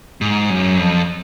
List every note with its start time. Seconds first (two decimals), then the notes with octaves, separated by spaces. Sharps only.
0.21 G#2
0.50 F#2
0.78 F2